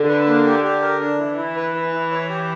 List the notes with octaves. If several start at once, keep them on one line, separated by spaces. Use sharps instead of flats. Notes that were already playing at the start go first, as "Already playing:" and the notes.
Already playing: D3
B4
A#3
G4
G4
A#4
D4
E3 E4
E4
B4
B4
E4
C#5
G4